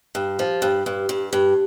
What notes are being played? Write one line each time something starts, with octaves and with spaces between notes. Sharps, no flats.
G2
F3
G2
G2
G2
G2